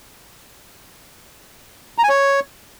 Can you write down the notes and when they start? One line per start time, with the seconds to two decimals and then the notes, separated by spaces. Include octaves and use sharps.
1.98 A#5
2.04 G#5
2.09 C#5